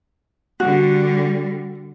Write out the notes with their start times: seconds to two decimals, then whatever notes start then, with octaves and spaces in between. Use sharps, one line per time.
0.60 D3 G3 F#4